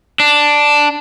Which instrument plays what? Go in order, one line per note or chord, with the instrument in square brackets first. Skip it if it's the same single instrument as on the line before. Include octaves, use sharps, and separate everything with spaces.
[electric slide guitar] D4